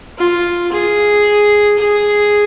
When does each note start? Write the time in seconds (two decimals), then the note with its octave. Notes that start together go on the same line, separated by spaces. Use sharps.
0.18 F4
0.72 G#4
1.78 G#4